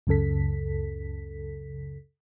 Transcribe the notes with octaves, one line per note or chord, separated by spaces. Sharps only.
C#2 F#2 C#3 A4 B6